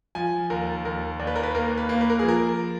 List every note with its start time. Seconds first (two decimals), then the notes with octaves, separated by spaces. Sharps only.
0.15 F3 G#5
0.50 D#2 A#4
0.85 D#2 A#4
1.19 D#2 D5
1.27 B4
1.36 A#4
1.43 B4
1.55 A#3 A#4
1.78 B4
1.89 A#3
2.01 B4
2.10 A#4
2.19 F3 G#4
2.28 A#4